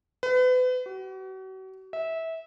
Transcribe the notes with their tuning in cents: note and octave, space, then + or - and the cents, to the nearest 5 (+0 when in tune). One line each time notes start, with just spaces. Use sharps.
B4 +35
F#4 +40
E5 -20